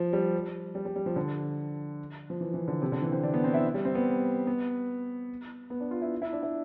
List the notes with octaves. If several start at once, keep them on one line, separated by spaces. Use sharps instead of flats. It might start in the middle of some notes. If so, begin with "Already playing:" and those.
Already playing: F3
G3
G3
G3
G3
F3
D3
F3
E3
E3
D3
C3
D3
E3
C4
D4
B3
C4
E4
G3
C4
B3
B3
B3
D4
F4
E4
E4
D4
E4